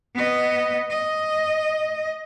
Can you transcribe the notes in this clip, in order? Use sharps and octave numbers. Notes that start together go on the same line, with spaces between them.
B3 D#5
D#5